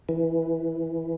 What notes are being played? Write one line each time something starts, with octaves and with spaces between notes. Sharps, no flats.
E3